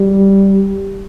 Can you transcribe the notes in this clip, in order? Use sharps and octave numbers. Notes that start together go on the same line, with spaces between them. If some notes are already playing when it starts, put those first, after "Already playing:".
Already playing: G3